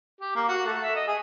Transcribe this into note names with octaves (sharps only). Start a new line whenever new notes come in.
G4
A#3
F#4
A3
E5
D#5
G#4